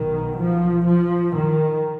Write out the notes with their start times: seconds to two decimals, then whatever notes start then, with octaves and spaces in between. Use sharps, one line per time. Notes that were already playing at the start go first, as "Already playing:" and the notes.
Already playing: B1 B2 D#3
0.37 F3
0.85 F3
1.35 D#3